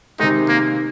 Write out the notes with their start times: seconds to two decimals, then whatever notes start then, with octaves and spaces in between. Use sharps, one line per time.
0.19 C3 D#3 G#3 D#4
0.49 A#3